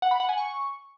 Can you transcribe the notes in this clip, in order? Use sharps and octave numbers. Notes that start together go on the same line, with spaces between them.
F#5
B5
F#5
G#5
C#6